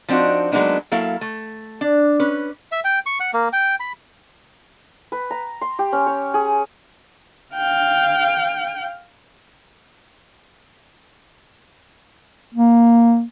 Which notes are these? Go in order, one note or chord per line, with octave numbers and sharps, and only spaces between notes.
F3 C4 D4 D#4 F#4
F#3 G#3 A#3 B3 D4 D#4
F#3 A#3 E4 A4 F5
A3
D4
C#4 B4
E5
G5
C#6
F#5
A#3
G5
B5
B4
A#5
C6
G4
C#4
C#5
G#4
F5 G5
A#3